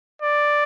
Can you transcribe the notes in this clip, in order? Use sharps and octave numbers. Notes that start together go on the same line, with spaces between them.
D5